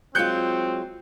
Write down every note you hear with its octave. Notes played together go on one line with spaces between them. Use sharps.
F#3 G#3 C4 F4 F#6 G6 C#7